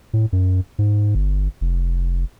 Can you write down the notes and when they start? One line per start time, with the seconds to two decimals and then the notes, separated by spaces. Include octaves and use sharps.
0.13 A2
0.33 F#2
0.79 G#2
1.15 G1
1.61 F1